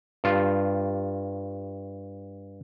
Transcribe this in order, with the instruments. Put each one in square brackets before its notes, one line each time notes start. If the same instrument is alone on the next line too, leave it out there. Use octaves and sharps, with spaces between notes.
[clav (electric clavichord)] G2 F4